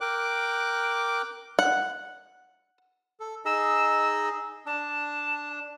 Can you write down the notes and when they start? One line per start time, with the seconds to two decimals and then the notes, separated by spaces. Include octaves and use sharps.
0.01 A#4 G5 D6 F#6
1.59 F#5
3.20 A4
3.45 D#4 G#4 D#5 E6
4.66 D4 A5